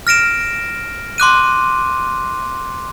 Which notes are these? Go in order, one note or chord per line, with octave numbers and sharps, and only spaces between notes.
F6 A#6 D7 E7
C6 D6 F#6 D#7